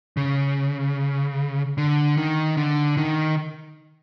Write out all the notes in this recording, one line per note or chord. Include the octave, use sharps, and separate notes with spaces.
C#3
D3
D#3
D3
D#3